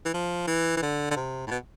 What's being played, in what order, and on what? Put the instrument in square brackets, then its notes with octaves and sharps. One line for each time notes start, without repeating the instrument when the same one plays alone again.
[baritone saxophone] E3
F3
E3
E3
D3
D3
C3
A2
B2